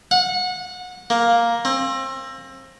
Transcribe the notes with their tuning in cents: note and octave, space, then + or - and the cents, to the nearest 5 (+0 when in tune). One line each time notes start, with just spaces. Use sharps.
F#5 -25
A#3 +5
C4 +30